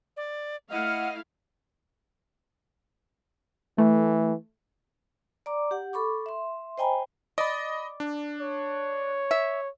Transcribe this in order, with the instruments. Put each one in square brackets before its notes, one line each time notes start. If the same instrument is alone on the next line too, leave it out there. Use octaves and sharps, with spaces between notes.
[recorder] D5
[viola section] A3 E4 F5 [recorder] D#5 [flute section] F#5 F6
[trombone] E3 [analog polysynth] A3
[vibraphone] D5 A#5 D6
G4 F#5
A4 B5 C#6 D6
E5 C6
C5 D#5 G5 G#5 A#5 B5
[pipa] D5 [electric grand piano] D#5 B5
[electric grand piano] D4
[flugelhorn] C#5
[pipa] E5